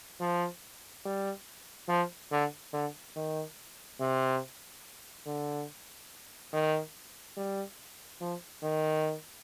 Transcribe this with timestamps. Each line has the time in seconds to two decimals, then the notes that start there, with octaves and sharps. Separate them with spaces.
0.21 F3
1.06 G3
1.89 F3
2.32 D3
2.73 D3
3.16 D#3
4.00 C3
5.26 D3
6.53 D#3
7.38 G3
8.21 F3
8.63 D#3